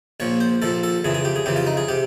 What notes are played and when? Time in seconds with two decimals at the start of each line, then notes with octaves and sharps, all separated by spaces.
0.20 A#1 A#2 F3 C#5
0.40 C5
0.62 A#1 A#2 F3 A4
0.83 A4
1.04 F2 C#3 E3 G#4
1.15 G#4
1.25 G4
1.36 G#4
1.46 F2 C#3 E3 G4
1.56 F4
1.67 D#4
1.77 G#4
1.88 C3 G4